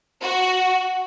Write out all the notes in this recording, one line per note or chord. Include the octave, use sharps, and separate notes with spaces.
F#4